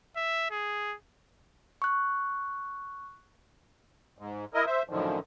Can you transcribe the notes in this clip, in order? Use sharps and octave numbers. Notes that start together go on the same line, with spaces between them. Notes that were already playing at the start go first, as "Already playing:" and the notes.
E5
G#4
C#6 F#6
G#2
E4 A#4 D#5
C5 E5
F#2 A2 D3 D#3 F3